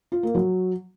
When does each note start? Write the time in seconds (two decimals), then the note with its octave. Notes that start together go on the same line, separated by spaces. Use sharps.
0.12 F4
0.23 A#3
0.35 F#3